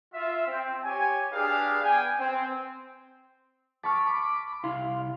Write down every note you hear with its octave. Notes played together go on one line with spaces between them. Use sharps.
F4 E5
C4
G4 C#5 G#5
D4 G4 G#4 B4 F5
B3 G5 G#5
C4
A5 B5 C#6 D6 F6
C2 E4 F5 C6 C7